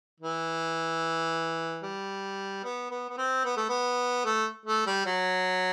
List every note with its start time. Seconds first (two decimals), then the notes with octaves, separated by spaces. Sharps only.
0.20 E3
1.83 G3
2.64 B3
2.91 B3
3.09 B3
3.17 C4
3.45 B3
3.57 A3
3.69 B3
4.25 A3
4.66 A3
4.87 G3
5.06 F#3